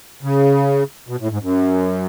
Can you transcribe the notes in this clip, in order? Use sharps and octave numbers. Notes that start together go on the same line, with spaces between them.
C#3
B2
A2
G#2
F#2